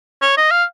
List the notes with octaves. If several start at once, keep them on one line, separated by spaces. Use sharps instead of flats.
C#5
D#5
F5